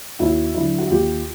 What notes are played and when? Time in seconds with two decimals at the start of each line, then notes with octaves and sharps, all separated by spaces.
0.19 D#2 E4 F#4
0.54 D3 F#3 E4
0.78 F#4
0.90 D#2 F4 G4